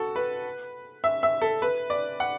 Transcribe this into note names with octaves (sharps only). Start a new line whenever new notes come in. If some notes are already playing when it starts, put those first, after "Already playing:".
Already playing: F#4 A4
B4
E5
E5
A4
B4
D5
F#5